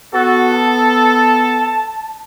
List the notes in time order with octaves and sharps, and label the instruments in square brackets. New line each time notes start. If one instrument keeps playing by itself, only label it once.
[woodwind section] B3 A4 [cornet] F#4
[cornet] A5